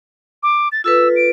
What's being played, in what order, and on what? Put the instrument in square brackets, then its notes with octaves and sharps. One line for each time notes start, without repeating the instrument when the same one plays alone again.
[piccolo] D6
A6
[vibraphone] F4 A4 B4 [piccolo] E6
[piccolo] D7